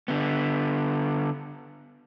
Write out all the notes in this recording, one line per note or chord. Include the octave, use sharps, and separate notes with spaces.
D3 B3